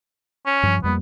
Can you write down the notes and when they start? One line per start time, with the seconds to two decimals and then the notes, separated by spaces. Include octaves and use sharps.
0.46 C#4
0.63 G2 F3
0.84 F2 G3 A#3 B3